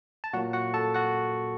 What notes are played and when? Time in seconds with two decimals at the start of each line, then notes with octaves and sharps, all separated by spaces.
0.24 A5
0.33 A#2 F#3 A#3 F#4 F#5
0.53 F#4 F#5
0.74 A4 A5
0.94 F#4 F#5